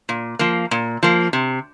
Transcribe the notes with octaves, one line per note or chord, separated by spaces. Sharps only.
A#2
F3 A#3
A#2
F3 A#3
C3